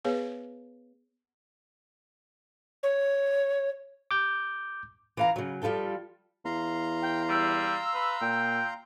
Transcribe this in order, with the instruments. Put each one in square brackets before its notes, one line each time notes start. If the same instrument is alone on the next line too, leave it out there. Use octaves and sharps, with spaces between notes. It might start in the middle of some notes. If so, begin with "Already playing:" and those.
[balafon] B3 G#4 B4 C#5 F5
[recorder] C#5
[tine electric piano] D6 G6
[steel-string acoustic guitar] E3 F5 A#5
C#3 F#3
F3 G3 F4 A4 G5
[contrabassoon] E2 [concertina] F5 A#5 C6
[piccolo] G5
[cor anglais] G3 [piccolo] E6
[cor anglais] B4
[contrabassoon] A#2 [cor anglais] G5